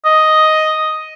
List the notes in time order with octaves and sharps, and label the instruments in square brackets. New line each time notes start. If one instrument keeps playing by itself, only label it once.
[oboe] D#5